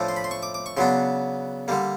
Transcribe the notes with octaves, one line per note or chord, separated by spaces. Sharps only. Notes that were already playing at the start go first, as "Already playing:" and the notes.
Already playing: A2 F3 A3 D4
C6
B5
C6
C#6
D6
D6
C#6
C#3 F#3 B3 D4 C6
D3 G3 A#3